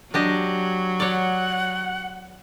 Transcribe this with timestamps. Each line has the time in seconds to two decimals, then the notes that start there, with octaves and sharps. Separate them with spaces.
0.14 F#3 D4 G4 D#5
1.00 C#5 D5 F#5